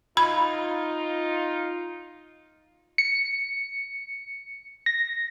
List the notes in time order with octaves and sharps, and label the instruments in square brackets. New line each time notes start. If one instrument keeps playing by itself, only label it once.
[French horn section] D#4 F4 [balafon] B5
[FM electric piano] C#7
A#6